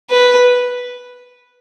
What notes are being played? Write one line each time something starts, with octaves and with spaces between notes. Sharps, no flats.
B4